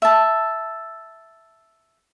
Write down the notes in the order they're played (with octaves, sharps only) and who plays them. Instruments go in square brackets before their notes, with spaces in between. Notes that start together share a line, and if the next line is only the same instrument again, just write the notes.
[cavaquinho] E5 A5